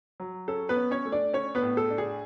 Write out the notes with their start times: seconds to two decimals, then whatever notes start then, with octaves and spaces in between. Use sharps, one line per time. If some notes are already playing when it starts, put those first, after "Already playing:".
0.20 F#3
0.48 C#4 A4
0.69 B3 B4
0.76 C#4
0.91 C#4 C#5
1.06 A3
1.12 D4 D5
1.33 C#4 D4 C#5
1.55 B3 B4
1.62 A2
1.77 A4
1.90 D4
1.98 G#4